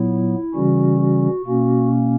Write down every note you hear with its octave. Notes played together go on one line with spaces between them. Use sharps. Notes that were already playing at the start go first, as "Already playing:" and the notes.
Already playing: A#2 F#3 B3 E4
C#3 E3 G3 C#4 F#4
F#4
B2 A#3 C#4 F#4